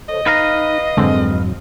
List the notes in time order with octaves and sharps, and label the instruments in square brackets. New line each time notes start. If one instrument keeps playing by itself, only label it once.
[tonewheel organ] A4 C5 C#5 [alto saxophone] D#5
[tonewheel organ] D#4 [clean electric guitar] B4 F5 A#5
[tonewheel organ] F2 G#2 F#3 [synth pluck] D3 G#3 C4